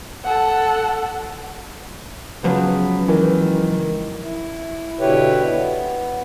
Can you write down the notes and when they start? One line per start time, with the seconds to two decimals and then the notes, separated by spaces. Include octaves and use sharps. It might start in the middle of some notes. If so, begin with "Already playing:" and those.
0.24 A4 F#5
2.44 G#2 C#3 F3 F#3 B3
3.08 D#3 E3
4.22 E4
5.00 B2 D3 E4 G4 B4 C#5
5.51 B3